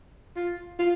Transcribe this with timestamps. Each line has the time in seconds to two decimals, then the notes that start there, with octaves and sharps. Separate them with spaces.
0.36 F4
0.79 F4